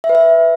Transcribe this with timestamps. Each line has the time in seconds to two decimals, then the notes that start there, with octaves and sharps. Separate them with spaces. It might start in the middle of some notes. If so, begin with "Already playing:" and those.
0.04 E5
0.09 B4
0.15 E5